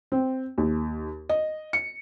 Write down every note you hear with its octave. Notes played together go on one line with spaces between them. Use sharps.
C4
D#2
D#5
C#7